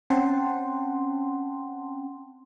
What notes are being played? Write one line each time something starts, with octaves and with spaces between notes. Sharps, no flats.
C4 C#4 F#5 G5 A5 C6